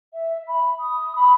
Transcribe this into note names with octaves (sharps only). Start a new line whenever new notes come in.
E5
B5
D#6
B5